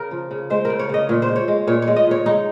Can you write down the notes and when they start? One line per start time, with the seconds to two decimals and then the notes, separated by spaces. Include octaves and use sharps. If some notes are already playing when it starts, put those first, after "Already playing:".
Already playing: C#3 A#4
0.11 F3
0.31 C#3
0.50 G#3 C5
0.65 C#3 A#4
0.79 C#5
0.89 C#3 D#5
1.09 A#2 C#5
1.22 C5
1.29 G#3
1.36 C#5
1.48 G#3
1.67 A#2 C#5
1.82 C#5
1.87 G#3
1.96 D#5
2.07 A#2 C#5
2.26 G#3 D#4